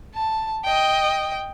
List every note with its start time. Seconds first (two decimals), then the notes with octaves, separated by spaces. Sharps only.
0.15 A5
0.64 D#5 G5